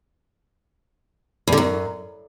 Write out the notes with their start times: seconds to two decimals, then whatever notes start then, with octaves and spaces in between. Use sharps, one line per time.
1.47 E2
1.53 D3
1.58 F#2